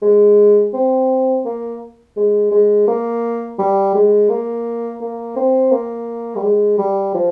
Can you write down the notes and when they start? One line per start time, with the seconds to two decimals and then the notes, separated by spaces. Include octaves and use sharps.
0.02 G#3
0.74 C4
1.45 A#3
2.16 G#3
2.52 G#3
2.88 A#3
3.59 G3
3.95 G#3
4.29 A#3
5.01 A#3
5.37 C4
5.72 A#3
6.36 G3
6.43 G#3
6.78 G3
7.14 F3